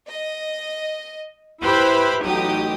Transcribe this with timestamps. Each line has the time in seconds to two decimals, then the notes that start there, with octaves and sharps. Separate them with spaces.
0.10 D#5
1.61 E4 G4 B4 C5 B5
2.25 A1 F#3 D#4 G4 D#6